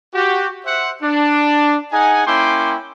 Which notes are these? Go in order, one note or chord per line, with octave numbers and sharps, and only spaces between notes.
F#4 G4
C5 E5 F#5
D4
D#4 G#4 F#5 G#5
A#3 C#4 E4 G5 C6 D6